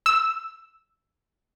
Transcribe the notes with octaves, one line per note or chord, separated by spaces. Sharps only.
E6